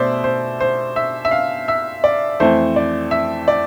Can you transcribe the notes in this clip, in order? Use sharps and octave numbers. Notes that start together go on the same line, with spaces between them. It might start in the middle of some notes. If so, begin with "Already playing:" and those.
Already playing: B2 A3 C5 D5 E5
C5
C5
E5
E5
F5
E5
D5
F2 E3 A3 C5
D5
E5
D5